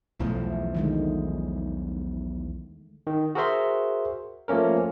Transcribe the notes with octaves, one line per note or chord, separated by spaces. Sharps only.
B1 E2 E3 F3 A3
D3 D#3 G#3
D#3
F#4 G#4 A#4 C5 E5 C6
F3 A3 A#3 C#4 A#4